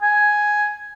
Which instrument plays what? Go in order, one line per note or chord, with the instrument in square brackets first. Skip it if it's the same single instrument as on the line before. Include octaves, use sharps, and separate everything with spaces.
[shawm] G#5